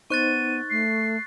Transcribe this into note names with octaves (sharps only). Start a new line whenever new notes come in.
B3 D#4 C5 C#6 F#6 A6 D#7
A3 C7